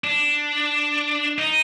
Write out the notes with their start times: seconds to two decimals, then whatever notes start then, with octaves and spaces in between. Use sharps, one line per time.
0.04 D4
1.38 D#4